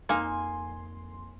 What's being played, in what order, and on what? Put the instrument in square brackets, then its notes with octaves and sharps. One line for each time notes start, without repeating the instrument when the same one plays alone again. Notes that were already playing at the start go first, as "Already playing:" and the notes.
[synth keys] F2 C6 [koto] A#3 D#4 [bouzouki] G#5